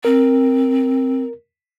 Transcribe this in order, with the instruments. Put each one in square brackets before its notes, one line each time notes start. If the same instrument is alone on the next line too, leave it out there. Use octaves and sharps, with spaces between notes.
[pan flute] C4 [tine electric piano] A#4